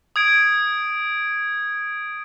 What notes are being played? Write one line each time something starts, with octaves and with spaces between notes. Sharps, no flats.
D#6 G#6 D7